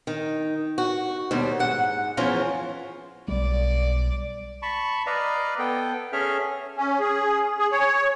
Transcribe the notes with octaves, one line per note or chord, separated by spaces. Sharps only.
D#3
F#4
D#2 B2 G3 C5
G#2 F#5
E2 E3 F3 C#4 F4 A#5
B1 G3 D5
A5 B5 C#6
B4 D5 D#5 F5 A#5
B3 A4 G5
C#4 G#4 A4 E5 F6
C#4
G#4
G#4
C#5